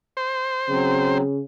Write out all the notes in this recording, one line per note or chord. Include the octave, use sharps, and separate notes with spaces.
C5
C#3 F#3 C4